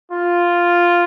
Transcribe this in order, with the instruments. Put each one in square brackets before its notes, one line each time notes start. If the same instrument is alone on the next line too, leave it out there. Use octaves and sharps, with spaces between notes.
[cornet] F4